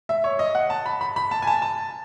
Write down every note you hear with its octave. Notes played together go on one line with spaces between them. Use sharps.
E5
C#5
D#5
F#5
A5
B5
B5
B5
A5
G#5
A5
A5